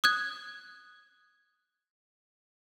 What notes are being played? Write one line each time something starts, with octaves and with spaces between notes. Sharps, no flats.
D#6 F#6 G#6